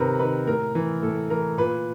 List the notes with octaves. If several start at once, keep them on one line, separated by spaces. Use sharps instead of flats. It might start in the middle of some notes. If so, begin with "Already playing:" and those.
Already playing: C3 D#3 A#4 B4
D#3 B4
A2 A#4
E3
A2 A4
E3 A#4
A#2 B4